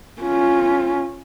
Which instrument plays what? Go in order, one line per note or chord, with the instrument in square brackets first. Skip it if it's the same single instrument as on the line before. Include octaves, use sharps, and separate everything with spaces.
[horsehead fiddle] C#4 F4